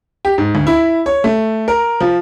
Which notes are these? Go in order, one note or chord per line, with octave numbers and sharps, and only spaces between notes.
G4
G#2
D2
E4
C#5
A3
A#4
F3